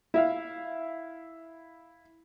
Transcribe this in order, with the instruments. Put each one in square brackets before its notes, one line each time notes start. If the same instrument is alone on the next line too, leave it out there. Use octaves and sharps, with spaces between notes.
[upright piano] E4 E5 F5